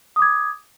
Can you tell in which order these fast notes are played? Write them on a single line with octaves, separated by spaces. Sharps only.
D#6 D6 G#6